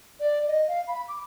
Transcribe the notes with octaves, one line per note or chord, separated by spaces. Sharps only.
D5
D#5
F5
B5
D6